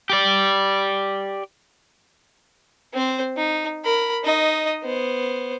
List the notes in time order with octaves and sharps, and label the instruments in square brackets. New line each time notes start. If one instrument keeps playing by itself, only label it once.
[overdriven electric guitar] G4 D5
[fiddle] C4 C5
D#4
A#4 B5
D#4 D#5
B3 C5